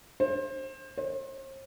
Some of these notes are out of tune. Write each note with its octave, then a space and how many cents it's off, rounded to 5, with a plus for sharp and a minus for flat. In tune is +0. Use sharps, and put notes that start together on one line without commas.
C5 +25
C5 +40